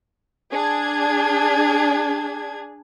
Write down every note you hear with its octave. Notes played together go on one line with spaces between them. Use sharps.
D4 G#4 G#6